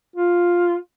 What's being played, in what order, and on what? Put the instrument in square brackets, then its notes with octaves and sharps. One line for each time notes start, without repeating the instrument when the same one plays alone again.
[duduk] F4